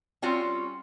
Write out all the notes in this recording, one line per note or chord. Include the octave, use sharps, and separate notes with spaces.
G3 C4 C#4 F4 F#4